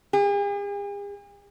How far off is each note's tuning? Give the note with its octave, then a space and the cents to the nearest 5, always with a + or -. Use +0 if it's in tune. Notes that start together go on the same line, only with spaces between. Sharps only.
G#4 -45